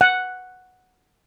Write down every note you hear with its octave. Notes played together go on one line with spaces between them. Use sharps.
F#5